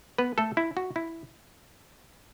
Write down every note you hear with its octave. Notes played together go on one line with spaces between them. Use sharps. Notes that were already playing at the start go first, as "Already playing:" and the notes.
B3 B4
A3 A4
E4
F#4
E4